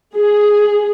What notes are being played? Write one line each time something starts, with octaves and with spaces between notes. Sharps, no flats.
G#4